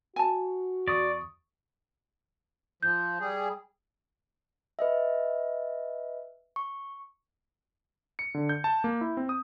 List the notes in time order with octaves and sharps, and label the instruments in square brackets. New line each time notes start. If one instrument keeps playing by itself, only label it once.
[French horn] F#4 [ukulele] G#5 A5
[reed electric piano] E2 C#6 D#6 [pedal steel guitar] D5
[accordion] F3 [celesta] G6
[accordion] G3 G#4
[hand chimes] B4 D#5 E5
C#6
[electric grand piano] C#7
D3
G6
A5
A#3
E4
C4
D#6